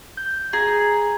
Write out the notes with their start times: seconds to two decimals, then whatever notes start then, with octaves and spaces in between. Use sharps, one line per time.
0.17 G6
0.53 G#4 A#5